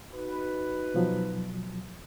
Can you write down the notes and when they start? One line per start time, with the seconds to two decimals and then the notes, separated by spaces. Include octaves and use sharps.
0.11 D#4 F#4 B4
0.94 B2 F3 F#3